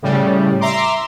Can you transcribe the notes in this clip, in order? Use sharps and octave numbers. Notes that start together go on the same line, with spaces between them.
A2 C#3 G3
E5 A#5 C6 D6